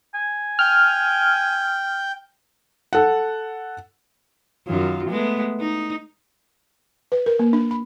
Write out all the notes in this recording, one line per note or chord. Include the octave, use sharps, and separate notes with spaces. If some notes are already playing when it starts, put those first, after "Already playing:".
G#5
G5 F6
A4 F#5
F#2 D#3 F4
G#3 A3 B3
D#4
B4
A#4
A#3
D4
B5